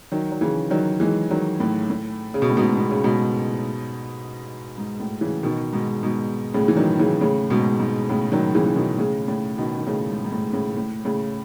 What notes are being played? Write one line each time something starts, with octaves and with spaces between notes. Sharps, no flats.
D#3 F#3
F#3
C#3 E3
D#3 F#3
E3 G#3
D#3 F#3
A2
A2
C#3
B2
A2
G#2 B2
B2
C#3
G#2 B2
G#2
A2
C#3 E3
B2 D#3
G#2 B2
G#2 B2
A2 C#3
E3
D#3 F#3
C#3 E3
A2 C#3
G#2 B2
G#2
A2 C#3
D#3 F#3
C#3 E3
E3
B2 D#3
A2 C#3
A2 C#3
B2 D#3
D#3
A2 C#3
G#2
G#2
A2
A2 C#3
A2
A2 C#3